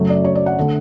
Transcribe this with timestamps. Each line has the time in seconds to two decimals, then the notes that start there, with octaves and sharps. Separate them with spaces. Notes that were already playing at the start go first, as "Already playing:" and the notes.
Already playing: F#2 C#3 F#3 A3 C#5
0.09 D5
0.24 C#5
0.35 D5
0.46 F#5
0.59 D3 A3